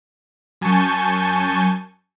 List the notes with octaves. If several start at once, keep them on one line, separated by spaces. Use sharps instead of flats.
F#2 G#5 A5 C#6 G6